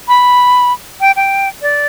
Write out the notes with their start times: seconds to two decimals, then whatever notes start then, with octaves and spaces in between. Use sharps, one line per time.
0.08 B5
1.01 G5
1.16 G5
1.62 D5